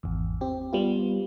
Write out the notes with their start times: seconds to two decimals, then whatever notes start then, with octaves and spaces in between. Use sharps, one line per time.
0.03 G#1 E2
0.41 C4 G4
0.73 G3 B3 F4